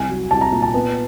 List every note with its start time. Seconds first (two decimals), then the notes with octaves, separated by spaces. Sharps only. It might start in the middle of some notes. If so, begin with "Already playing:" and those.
Already playing: C2 G#5
0.09 F#3
0.31 C2 A5
0.41 A#5
0.52 A#2
0.62 A5
0.74 B3